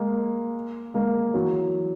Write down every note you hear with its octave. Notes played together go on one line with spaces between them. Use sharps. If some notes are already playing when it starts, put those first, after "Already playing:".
Already playing: G#3 A#3
G#3 A#3
E3 F#3